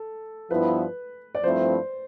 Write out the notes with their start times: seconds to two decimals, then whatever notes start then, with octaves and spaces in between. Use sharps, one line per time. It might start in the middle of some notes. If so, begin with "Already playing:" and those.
Already playing: A4
0.50 G2 F3 B3 E4 B4
1.35 D5
1.44 G2 F3 A3 C4 E4 C5